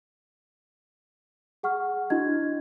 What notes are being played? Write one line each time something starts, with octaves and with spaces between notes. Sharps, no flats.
G#4 F#5 C#6 F6
D4 E4 F#4 D#5 G#6